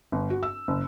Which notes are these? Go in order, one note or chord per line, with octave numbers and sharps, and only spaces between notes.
G1
F#4
E6
F#1